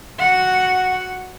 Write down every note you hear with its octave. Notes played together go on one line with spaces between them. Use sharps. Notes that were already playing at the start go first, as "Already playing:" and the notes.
F#4 F#5